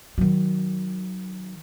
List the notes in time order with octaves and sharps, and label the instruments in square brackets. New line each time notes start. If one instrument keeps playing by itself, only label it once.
[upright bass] D#3 F#3